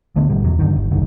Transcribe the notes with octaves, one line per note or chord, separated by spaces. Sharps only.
D2 D3 A3 B3
G#1 B2 G3
E2 F#3
G2 D3 D#3
G1
F#1 C2 D#3